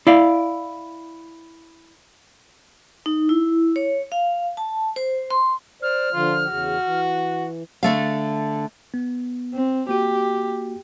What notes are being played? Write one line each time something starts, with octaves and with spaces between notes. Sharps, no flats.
E4 D5 F5
D#4
E4
C#5
F5
A5
C5
C6
C5 D5 F6
D3 F3 F4
E2 C#3 F#4
E3
D3 A3 F5
B3
C4
A#3 F#4 G4